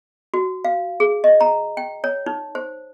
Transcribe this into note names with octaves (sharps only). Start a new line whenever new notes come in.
F#4
F5
G#4
D#5
A#5
G5
C#5
D#4
C5